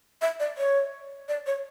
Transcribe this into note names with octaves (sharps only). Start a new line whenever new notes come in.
E5
D5
C#5
D5
C#5